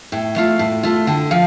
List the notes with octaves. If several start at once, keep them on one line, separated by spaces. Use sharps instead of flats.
A2 G5
A3 F4
A2
A3 F4
D3 G5
F3 F5